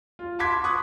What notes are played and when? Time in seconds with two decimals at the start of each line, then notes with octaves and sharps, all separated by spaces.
0.19 F4
0.39 A5 B5 C6 D6 G#6 B6
0.64 C#6 D#6 F#6